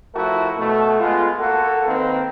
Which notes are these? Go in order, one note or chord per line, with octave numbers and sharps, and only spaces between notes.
F3 A3 E4 F#4 A#4
B2 A3
G#3 B3 F4
A#3 F#4 A4
D#3 A#3 C4 A#4 B4